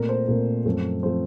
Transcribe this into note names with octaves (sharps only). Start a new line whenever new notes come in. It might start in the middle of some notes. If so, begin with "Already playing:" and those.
Already playing: A#2 A3 C4 A#4
C5
A#2 A3 C4 A#4
F#2 F3 A3 C4
F3 A3 C4 C5